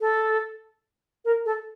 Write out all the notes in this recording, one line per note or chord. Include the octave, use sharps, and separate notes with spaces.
A4
A#4
A4